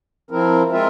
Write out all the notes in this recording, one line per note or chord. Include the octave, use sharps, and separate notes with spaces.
F3 C4 E4 A#4
G#3 C4 F4 A#4 E5